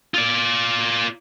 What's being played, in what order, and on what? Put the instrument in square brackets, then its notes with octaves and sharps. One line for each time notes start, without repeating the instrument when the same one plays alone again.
[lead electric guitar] F4 D5